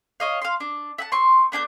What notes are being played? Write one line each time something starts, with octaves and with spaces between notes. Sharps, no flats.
C#5 D#5 F5
F5 C6
D4
E5 F#5 A5
C4 C6 C#6
B3 D4 A5 G6